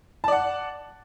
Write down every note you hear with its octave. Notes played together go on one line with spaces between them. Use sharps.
D5 F#5 A5